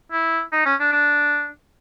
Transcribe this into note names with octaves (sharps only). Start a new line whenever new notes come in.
E4
D#4
C#4
D4
D4